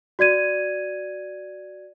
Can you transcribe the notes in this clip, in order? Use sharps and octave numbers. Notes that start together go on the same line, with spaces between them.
F#4 D5 G#6 D#7